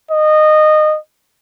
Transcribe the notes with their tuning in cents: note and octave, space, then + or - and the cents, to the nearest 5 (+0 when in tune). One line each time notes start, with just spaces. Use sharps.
D#5 -20